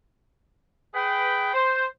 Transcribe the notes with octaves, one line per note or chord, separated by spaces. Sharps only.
G#4 B4 G5
C5